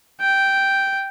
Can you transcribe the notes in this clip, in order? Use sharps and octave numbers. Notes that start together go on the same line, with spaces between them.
G5